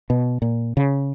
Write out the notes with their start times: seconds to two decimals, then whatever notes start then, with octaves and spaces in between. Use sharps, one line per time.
0.10 B2
0.42 A#2
0.77 C#3